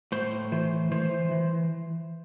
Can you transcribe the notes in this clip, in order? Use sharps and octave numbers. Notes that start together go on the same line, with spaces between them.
A2 C5
E3 C5
E3 C5
E3